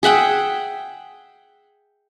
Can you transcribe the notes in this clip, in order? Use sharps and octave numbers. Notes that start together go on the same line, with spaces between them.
G#4 E5 F#5 G5